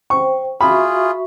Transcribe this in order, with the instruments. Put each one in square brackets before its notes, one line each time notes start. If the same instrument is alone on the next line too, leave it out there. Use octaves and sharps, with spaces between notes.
[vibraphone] C5 G5 [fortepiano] C#6
[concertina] F4 G#4 [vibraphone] F#4 E5 C#6 [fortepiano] B5